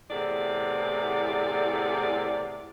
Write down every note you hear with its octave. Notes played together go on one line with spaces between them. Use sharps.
E2 A2 C3 D5